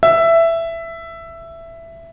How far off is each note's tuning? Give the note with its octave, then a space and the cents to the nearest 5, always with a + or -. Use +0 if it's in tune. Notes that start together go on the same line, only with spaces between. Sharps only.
E5 +10